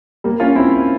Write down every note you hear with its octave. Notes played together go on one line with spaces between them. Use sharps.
G3 A#3
C#4 F4
C4 E4